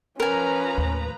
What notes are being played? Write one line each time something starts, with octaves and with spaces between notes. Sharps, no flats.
F3 C#4 A#4 B4 G#5 A#5
D#2 A2